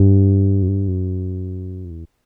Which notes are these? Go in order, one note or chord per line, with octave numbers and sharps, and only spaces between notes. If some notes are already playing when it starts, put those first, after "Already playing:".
Already playing: G2
F#2
G2
F#2
F2
E2